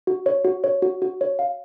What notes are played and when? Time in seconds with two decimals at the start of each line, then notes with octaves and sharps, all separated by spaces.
0.07 F#4
0.26 C#5
0.44 F#4
0.64 C#5
0.82 F#4
1.02 F#4
1.21 C#5
1.39 F5